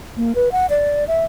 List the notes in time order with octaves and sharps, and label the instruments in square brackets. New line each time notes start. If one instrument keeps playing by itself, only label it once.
[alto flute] A#3
B4
F#5
D5
E5